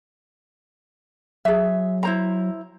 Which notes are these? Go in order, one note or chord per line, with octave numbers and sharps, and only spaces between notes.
F#3 G#4 E5
E4 C5 A#5